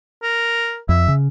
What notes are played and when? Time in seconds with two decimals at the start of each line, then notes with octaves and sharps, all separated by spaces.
0.23 A#4
0.89 F2 E5
1.08 C#3